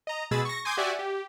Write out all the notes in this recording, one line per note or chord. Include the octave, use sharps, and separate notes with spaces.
D#5 A#5
B2 G#3 G#4 B5 E6 A6
C#6 A#6
G#5 C6 D6 D#6 G6 G#6
F#4 G4 D5 E5 F#5 G#5
G4